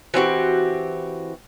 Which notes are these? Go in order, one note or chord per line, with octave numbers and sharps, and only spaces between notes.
E3 C4 F#4 G4